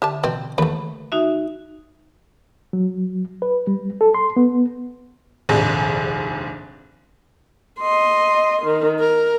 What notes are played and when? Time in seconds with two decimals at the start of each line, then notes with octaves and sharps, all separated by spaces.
0.02 D3 G4 E5 A5
0.24 B2 C4
0.58 D#2 A3 B4
1.12 D#4 F#4 E5
2.73 F#3
3.42 B4
3.67 G3
4.01 A4
4.15 C6
4.37 B3
5.49 F1 A#1 D#2 G#2
7.80 D#5 C6
8.63 D#3
9.00 A#4